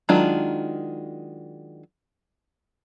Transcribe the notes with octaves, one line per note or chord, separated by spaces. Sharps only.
D#3 F#3 G#3 D4 F4